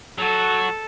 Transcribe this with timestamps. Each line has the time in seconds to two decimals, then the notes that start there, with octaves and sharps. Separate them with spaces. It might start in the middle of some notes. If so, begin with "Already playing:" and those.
0.18 F#3 F#4 A4